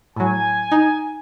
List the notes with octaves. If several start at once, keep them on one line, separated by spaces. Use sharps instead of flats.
A2 F#3 G#5
D#4